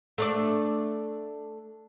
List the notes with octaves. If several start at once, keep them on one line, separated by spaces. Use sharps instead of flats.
A3 D4 D5